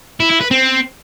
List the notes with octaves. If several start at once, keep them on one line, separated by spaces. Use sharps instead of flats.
E4
E4
B4
C4